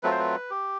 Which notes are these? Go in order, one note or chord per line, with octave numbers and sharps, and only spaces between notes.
F#3 A3 C4 F4 B4
C5
B4
G4